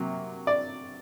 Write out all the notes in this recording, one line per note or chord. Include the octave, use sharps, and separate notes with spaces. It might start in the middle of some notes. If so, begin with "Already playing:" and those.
Already playing: C3 F#3 A#3
D5